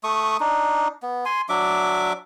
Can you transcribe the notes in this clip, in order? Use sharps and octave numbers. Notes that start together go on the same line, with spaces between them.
A3 C#6 D#6
D4 D#4
B3
G#5 C6
F#3 D4 E5 D6